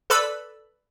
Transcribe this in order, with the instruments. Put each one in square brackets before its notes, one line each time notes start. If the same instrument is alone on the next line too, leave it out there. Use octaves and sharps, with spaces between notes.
[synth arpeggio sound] A4 B4 D5 B5 E6